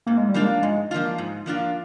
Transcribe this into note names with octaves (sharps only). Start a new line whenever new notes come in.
G#2 A#3
G#3
G3
F3 G#3 A#3 D4 F4
G#2 G#3
F3 A#3 D4 F4
G#2
F3 A#3 D4 F4